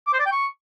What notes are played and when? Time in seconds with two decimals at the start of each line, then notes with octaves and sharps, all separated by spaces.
0.07 D6
0.13 C5
0.19 D5
0.26 G5
0.32 C#6